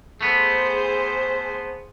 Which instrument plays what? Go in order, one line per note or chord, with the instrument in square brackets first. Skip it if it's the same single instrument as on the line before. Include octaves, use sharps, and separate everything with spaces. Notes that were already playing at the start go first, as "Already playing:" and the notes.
[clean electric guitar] A3 B3 [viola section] G#4 C5